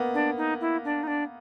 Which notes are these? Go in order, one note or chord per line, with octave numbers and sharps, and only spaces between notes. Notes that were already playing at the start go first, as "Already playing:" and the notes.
Already playing: A#3 B3
D4
D#4
E4
D4
D#4
D4